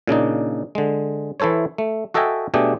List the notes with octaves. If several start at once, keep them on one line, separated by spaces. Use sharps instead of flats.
A#2 C#3 D4 D#4
D3 G#3
E3 E4 A4 C5 C#5
A3
F#4 A4 D#5 E5 G5 G#5
B2 A3 D4 G4 G#4